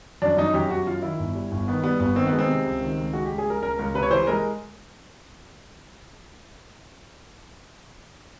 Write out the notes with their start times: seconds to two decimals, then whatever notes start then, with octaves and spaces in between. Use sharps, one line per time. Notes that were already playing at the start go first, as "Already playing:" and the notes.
0.22 F#2 D4
0.37 F#2 D#4
0.54 F#2 G4
0.70 F#2 F#4
0.87 F#2 F4
1.02 D#3 E4
1.19 G1
1.35 G3
1.52 G1
1.67 D#3 B3
1.84 G3 B3
2.00 G1 B3
2.16 D#3 C4
2.27 B3
2.33 G#3
2.39 C4
2.48 C3
2.65 C#2
2.81 D#3
2.98 C#2
3.13 G#3 F#4
3.26 C#2 G4
3.38 G#4
3.46 G#3 A#4
3.62 C#2 A#4
3.78 C#2 A#4
3.94 C3 B4
4.02 C#5
4.10 E3 C5
4.27 G#3 A#4